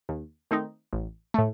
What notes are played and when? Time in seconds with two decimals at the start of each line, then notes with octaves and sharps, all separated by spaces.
0.09 D#2
0.51 D#3 A3 C4 D#4
0.93 A1
1.34 A2 A3